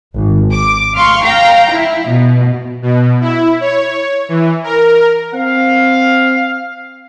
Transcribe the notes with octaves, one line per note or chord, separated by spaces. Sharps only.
G#1
D6
F5 C6 C#6
F5 G5 A#5
E4
B2
B2
E4
C#5
E3
A#4
C4 F5